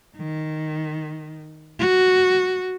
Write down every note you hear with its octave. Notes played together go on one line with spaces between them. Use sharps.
D#3
F#4